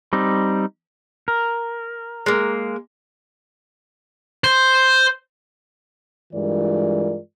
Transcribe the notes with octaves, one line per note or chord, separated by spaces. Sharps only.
G3 C4 D#4
A#4
G#3 A#3
C5
G2 E3 G#3 F4 A#4 D5